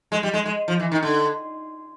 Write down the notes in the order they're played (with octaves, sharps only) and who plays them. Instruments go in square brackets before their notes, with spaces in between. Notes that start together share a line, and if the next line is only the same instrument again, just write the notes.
[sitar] G#3
G3
G#3
G#3
F3
E3
D#3
D3